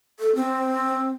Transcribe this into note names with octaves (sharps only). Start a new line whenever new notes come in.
A4
C4